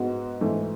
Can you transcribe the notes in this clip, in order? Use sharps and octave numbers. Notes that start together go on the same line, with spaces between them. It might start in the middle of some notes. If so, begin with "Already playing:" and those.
Already playing: G#2 G#3 B3 F#4
G#2 E3 A3